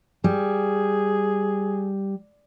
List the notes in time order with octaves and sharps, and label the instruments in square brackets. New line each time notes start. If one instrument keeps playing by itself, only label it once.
[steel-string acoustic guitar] G3 [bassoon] G#4